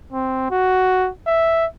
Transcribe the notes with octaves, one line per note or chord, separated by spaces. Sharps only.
C4
F#4
E5